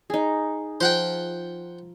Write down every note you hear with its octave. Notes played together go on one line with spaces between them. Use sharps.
D#4 G#4
F3 C5 F#5 G5